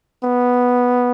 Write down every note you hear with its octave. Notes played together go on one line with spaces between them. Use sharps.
B3